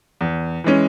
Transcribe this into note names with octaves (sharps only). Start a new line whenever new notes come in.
E2
E3 G#3 C#4